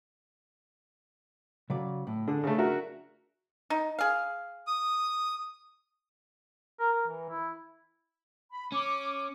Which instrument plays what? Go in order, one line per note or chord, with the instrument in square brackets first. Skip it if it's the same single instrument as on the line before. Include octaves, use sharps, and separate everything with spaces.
[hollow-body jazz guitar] C#3 F#3 D5
A2
[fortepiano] D3 [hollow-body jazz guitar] D4 G#4
[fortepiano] C#3 A3
F#4 A#4 E5
[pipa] D#4
G#4 F5
[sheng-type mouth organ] D#6
[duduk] A#4
A#4
E3
E4
[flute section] B5
[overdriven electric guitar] C#4 [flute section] D6